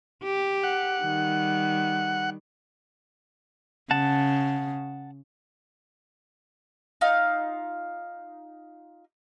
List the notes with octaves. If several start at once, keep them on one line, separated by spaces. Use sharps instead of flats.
G4
F#5
D#3 G3
C#3 F#5 A5
D#4 F4 F5